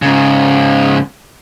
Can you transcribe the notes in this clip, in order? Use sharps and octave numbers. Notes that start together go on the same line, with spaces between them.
G#2 C#3